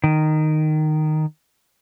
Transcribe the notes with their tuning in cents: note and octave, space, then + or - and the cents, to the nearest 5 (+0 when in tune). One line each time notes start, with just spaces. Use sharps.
D#3 -10